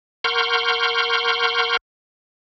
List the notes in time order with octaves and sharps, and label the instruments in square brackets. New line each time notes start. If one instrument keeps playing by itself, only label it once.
[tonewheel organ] A#4 F#5 C6 C#6 F6 G6